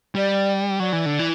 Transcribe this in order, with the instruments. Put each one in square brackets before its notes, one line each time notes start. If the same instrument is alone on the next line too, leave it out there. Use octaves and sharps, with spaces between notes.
[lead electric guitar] G3 [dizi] D5
[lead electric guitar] F#3 [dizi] D5
[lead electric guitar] E3
D3
E3